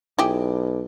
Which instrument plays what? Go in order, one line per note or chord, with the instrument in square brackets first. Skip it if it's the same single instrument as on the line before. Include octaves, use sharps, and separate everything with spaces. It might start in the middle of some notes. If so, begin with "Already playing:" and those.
[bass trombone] B1 [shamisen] E4 G4 G#4